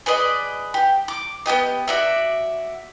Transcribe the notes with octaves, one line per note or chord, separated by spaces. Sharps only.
G#4 B4 D5 D#5
G4
D6
B3 F4 G4 D#5
F#4 D5 E5